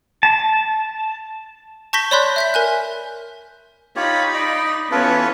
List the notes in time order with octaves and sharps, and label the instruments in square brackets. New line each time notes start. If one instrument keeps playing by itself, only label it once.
[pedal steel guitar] A5
[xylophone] A5 C#6 G6 A#6 B6 G7
C#5 D5 B5 C6 F#6 G6
E5 G6 B6
A#4 G#5 F#6
[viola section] D#4 B5 [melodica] F4 G4 C#5
[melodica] D5 D#5
[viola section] E3 B3 C#4 [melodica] F4 A4 B4